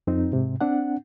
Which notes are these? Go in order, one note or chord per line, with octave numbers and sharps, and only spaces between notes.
F2 C4 D#4
G#2 C3
C4 D4 F#5